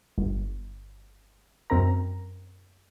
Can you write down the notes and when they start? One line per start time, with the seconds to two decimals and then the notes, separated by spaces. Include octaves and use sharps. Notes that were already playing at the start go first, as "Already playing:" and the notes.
0.18 G1
1.70 F#2 C4 A#4 A#5